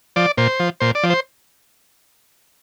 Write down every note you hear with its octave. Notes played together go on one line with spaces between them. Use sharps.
F3 D5
A#2 C5
F3
A#2 C5
D5
F3
C5